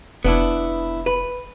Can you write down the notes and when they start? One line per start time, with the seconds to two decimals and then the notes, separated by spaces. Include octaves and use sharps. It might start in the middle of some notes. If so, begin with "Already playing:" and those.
0.24 F1 B3 D4 E4
1.06 B4